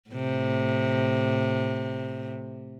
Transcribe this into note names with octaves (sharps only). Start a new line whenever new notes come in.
A2 C3